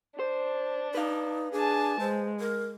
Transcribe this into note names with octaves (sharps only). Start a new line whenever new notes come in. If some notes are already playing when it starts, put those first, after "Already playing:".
D4 C5
D#4 B4 F5
D4 G#4 G#5 A5
G#3 C5
A#4